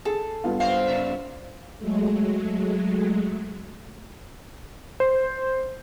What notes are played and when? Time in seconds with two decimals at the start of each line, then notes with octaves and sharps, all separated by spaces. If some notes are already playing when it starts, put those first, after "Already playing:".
0.05 G#4 A4
0.44 G2 B3 F4
0.60 C4 C5 F5
0.86 C#3 E5
1.78 F#3 G#3 A3
5.00 C5